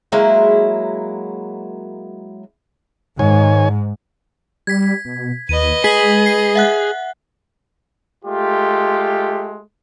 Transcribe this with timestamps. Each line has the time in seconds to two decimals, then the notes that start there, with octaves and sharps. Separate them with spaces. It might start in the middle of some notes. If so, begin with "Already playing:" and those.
0.12 F#3 G#3 A#3 E4
3.19 G#2 D#3 C#5 G#5
4.67 G3 G#6 B6
5.05 B2
5.49 D#2 B4 D#5 D#7
5.84 G#3 G#4 B6 F#7
6.26 C7
6.55 E5 F#5 F#6
8.25 G#3 A3 F4 G4